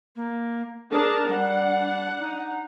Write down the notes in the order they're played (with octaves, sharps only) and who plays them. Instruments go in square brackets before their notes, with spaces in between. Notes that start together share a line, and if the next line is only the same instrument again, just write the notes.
[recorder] A#3
[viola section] D4 A#4 A5 [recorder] G#4
[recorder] G3 [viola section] D4 F#5
[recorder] D#4